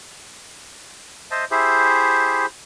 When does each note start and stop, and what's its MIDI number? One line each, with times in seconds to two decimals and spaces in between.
1.31 1.45 72
1.31 1.45 75
1.31 1.45 76
1.31 1.45 81
1.51 2.46 64
1.51 2.46 67
1.51 2.46 68
1.51 2.46 72
1.51 2.46 76